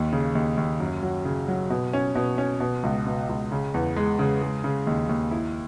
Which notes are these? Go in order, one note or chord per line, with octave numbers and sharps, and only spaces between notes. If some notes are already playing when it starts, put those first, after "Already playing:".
Already playing: D#2
C#3
D#2
D#2
F#2
F#3
C#3
F#3
B2
C#4
B2
C#4
B2
C#2
B2
C#2
C#3
E2
G#3
C#3
G#3
C#3
D#2
D#2
E4